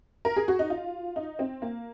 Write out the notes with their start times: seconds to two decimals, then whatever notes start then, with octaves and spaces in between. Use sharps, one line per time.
0.25 A#4
0.36 G#4
0.48 F#4
0.59 D#4
0.70 F4
1.16 D#4
1.39 C4
1.62 A#3